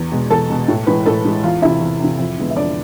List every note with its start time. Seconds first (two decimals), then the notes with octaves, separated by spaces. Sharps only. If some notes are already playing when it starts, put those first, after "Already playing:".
Already playing: E2
0.12 B2 G#3
0.30 E2 A4 A5
0.50 B2 G#3
0.68 A2
0.87 E3 G#3 B4 B5
1.06 A2 A4 A5
1.25 E3 G#3
1.44 E2 F4 F5
1.62 C3 E3 E4 E5
1.81 E2
2.00 C3 E3
2.18 F2
2.37 D3 G#3 B3
2.50 E5
2.56 F2 D4 D5